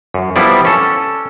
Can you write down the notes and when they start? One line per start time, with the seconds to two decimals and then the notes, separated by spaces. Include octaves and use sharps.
0.14 F#2
0.36 F3 G3 B3 C4 E4 D5
0.65 C#4 A4